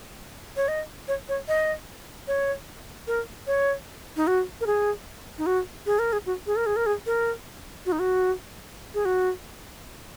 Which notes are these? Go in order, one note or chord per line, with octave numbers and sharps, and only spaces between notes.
C#5
D#5
C#5
C#5
D#5
C#5
A#4
C#5
D#4
F#4
A#4
G#4
D#4
F#4
G#4
A#4
G#4
F#4
G#4
A#4
G#4
A#4
G#4
A#4
F#4
D#4
F#4
G#4
F#4